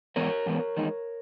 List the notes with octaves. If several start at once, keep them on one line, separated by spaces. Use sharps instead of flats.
G#2 E3 B3 A#4 C#5
G#2 E3 B3
E2 D#3 G#3 D#4